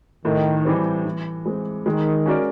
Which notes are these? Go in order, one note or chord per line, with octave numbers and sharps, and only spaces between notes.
A2 D#3
E3 G3 C4
E3
G#3 C4
D#3 G#3
C#4 F#4 A#4 D5